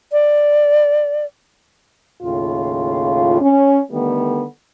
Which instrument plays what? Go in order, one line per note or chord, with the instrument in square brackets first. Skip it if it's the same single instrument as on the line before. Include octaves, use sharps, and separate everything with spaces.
[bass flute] D5
[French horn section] D#2 A2 C#3 F4
C#4
D3 D#3 G3 A3 B3